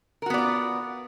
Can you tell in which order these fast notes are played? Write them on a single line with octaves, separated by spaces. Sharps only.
A#4 F#4 B3 D5 F4